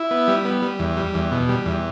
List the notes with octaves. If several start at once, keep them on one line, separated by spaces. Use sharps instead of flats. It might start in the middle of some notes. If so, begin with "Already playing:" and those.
Already playing: E4
B3
G3
B3
G3
E2
G3
E2
B2
G3
E2